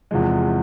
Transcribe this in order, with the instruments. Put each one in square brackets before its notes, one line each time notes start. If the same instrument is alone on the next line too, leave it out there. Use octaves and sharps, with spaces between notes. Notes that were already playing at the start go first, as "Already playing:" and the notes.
[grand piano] E2 C3 F3 G#3